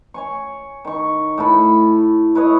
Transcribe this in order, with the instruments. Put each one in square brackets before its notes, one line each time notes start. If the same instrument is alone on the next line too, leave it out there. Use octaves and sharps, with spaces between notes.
[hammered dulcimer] C#5 G#5 C#6
D#3 C#6
A2 A5 B5
E4 B4 C#5 D#5